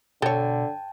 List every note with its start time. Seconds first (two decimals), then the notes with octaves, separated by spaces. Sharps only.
0.22 B2 D3 A4 C#5 G5 A5